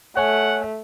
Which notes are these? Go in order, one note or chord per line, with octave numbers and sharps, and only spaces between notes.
A3 C#5 F#5 G#5